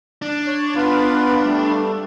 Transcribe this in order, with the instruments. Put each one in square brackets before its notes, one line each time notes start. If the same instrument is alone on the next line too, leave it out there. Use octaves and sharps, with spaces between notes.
[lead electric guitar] D4
[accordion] C#5
B3 F4 B4
G3 A3